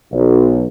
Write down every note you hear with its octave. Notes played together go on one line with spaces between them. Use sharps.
B1